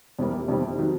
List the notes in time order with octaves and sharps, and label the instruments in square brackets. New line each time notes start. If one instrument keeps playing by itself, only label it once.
[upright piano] F2 C3 E3 G3 A#3
F2 C3 D#3 G3 C4
D#3 F#3